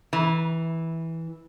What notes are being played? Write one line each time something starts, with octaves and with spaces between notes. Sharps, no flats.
E3